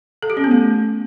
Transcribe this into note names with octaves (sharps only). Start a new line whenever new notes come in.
A4
G4
C#4
B3
A3